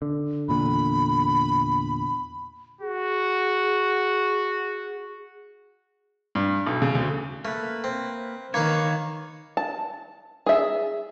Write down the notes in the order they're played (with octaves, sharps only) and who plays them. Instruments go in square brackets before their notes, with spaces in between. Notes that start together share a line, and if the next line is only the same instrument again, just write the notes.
[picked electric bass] D3
[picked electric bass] E2 A#2 D3 [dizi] B5
[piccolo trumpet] F#4 [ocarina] G#4
[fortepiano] G2
B1
C#3
D2
[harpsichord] A3 [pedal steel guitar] A#3 B4
[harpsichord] C4
[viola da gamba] D#3 [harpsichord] A#3 B4 F5 [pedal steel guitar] C#5
[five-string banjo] A5
G#4 E5